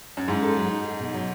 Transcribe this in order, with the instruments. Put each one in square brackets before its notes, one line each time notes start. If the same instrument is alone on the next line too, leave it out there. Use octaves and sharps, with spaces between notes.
[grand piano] F#2
[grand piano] G#2 [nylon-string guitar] E4
[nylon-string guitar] A4
F#3
D#4
G#4
B2
F#3